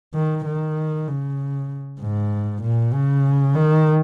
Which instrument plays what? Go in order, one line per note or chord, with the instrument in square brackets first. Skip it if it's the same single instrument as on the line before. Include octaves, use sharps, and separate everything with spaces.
[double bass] D#3
D#3
C#3
G#2
A#2
C#3
D#3